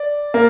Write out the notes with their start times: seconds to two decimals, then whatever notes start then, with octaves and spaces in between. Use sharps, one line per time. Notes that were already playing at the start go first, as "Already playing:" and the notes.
Already playing: D5
0.34 A#3